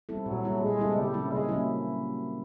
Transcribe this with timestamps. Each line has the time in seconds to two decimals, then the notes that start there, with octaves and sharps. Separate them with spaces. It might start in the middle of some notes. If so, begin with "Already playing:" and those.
0.09 G3 C4 E4 A4
0.26 A#2 F#3
0.44 G3 C4 E4 A4
0.61 A#2 G#3
0.78 G3 C4 E4 A4
0.96 C#3 G3
1.13 F#3 A#3 C#4 E4
1.31 C#3 G#3
1.48 F#3 A#3 C#4 E4